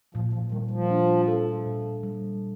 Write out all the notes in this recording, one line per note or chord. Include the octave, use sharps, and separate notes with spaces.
A#2 F3
F3
D#3 G3
F3
D4
A4
A#2
G3